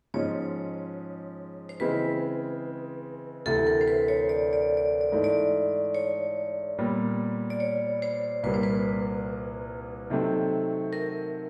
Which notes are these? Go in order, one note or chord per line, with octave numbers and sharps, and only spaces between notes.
G#2 F3 G#3 C#4 C#5
C5
C#3 E3 G#3 C4 B4
D2 C3 E3 A4
A#4
C5
B4
C#5
D5
D5
D5
D5
G#2 E3 A3
D5
C#5
A#2 G3 B3
D5
C#5
C5
C2 A#2 G3 A#3 B4
C5
B4
C3 D#3 F#3 A3 C4
A#4